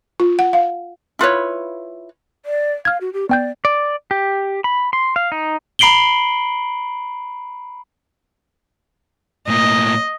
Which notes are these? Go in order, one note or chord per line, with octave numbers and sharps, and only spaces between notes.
F4
F#5
F5
E4 F4 B4 C#5
D5
F5 F6 G#6
F#4
G4
B3 D5 G5 G6
D5
G4
B5
C6
F5
D#4
A#5 B5 C7 D7 F#7 G7
A2 A#3 D#5